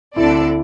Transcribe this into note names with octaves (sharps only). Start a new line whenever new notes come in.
D2 D3 C4 E4 A4 D5